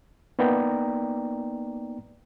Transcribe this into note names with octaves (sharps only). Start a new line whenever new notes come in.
A#3 B3 D#4 D5 G5 A#5